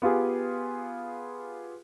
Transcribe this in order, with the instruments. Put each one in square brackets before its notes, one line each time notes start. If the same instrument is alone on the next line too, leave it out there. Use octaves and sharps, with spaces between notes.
[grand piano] B3 F4 G4 G#4